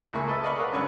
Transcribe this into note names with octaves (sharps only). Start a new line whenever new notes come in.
C#2 A2 A#3 E4 G#5 C#6
A4 B4 D#5 E5 A5
D5 D#5 F5 B5 C#6
A#4 B4 C#5 F5 F#5
G2 D3 C#4 B4 C#6 E6